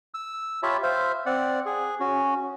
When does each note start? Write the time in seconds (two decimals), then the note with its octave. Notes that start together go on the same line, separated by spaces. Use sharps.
0.14 E6
0.63 F4 G4 C#5 E5 A5 B5
0.83 C5 E5 F5
1.26 C4 D5 F#5
1.66 G#4
2.00 C#4 F#4